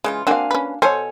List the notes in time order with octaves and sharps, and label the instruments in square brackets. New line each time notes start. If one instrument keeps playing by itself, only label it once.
[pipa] C#3 E3 F4 [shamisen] G#3
[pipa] A#3 F#4 G#5 [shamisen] C4 [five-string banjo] D4 F5
[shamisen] C#4 B4
[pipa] B2 G#5 [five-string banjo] A4 C#5 [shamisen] C5